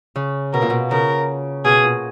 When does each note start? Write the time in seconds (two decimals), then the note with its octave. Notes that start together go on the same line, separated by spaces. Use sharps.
0.16 C#3
0.53 B2 A#4
0.62 A#2
0.70 B2
0.91 C#3 A#4
1.65 B2 G#4
1.84 A#2